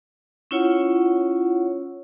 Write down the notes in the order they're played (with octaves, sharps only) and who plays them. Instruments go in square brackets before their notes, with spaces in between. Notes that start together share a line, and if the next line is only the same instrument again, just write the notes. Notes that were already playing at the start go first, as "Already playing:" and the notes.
[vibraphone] C#4 E4 F4 C#5 F#5